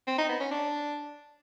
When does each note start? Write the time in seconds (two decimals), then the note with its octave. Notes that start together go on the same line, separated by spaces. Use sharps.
0.07 C4
0.18 D#4
0.29 B3
0.40 C#4
0.51 D4